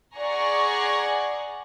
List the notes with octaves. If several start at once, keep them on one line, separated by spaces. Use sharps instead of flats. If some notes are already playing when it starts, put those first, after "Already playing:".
G#4 D5 F#5 G#5 A#5 C#6